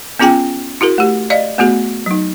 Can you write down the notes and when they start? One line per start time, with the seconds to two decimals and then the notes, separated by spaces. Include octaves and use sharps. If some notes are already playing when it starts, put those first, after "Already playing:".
0.20 B3 C#4 F4 G#4 G5 G#5
0.81 E4 F#4 G#4 A#4
0.98 A3 G4
1.30 D5 D#5 F5
1.58 A3 B3 F#4 G#4
2.06 F#3 D#4